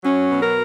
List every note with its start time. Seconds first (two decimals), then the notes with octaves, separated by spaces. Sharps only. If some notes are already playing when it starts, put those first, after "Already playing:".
0.04 F#3 C#4
0.30 B2
0.43 A#4